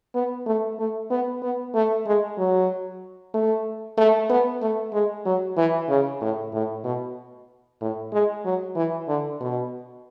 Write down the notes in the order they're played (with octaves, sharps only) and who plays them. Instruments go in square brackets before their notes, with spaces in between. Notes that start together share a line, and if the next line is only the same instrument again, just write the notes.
[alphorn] B3
A3
A3
B3
B3
A3
G#3
F#3
A3
A3
B3
A3
G#3
F#3
E3
C#3
A2
A2
B2
A2
G#3
F#3
E3
D3
B2